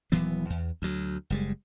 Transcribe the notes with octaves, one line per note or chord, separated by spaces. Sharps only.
D#1 E3 F#3 B3
E2
D2 F#3
F#1 G3 G#3